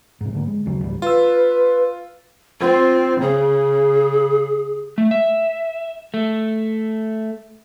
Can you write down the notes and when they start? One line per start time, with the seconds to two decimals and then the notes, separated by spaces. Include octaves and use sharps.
0.21 G#2 C3
0.33 G#2 D3 A#3
0.48 G#3
0.65 F#1 D#2 C#3 F#3
0.84 C#2 G#2 E3 G3
1.02 F4 B4 E6
2.60 C4 F4
3.21 C#3 G#4
4.98 A3
5.11 E5
6.14 A3